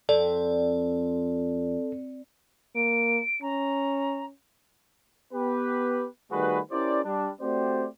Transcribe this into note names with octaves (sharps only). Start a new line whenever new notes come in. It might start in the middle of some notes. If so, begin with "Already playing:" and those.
F2 A4 D5
A#3 D7
C#4 A#5
B3 G4 B4
D#3 G3 A3 F#4 G#4 B4
C#4 E4 G4 A#4 C5 D5
G3 D4
A3 C4 F#4 G4 C5 D5